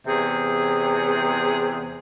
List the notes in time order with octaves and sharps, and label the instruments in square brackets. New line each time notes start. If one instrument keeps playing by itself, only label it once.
[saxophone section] E2 C3 G#4